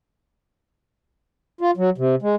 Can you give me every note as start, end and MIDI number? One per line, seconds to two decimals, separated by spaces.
1.61 1.71 65
1.77 1.90 54
1.98 2.15 48
2.22 2.35 56